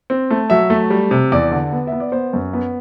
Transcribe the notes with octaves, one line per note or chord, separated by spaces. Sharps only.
C4
A3
F#3 E5
A3
G3
C3
E2 D5
D3
B3
B3 E5
D5
B3 C5
F#2
B3